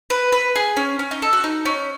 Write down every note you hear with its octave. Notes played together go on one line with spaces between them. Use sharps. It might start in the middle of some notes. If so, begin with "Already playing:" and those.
B4
B4
G#4
C#4
C#4
D#4
A4
F#4
D#4
C#4